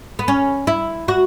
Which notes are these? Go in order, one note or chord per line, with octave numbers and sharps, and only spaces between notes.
B3
C#4
E4
F#4